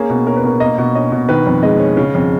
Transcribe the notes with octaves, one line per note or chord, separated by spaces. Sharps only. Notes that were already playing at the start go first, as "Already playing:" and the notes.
Already playing: A#3 C#4 G#4
B2
C#4 A#4
B4
B2 A#4
A#3 D#5
B2
C#4 D#5
B2
D#3 B4
F2
G#3 D#5
C#4
C#3
F2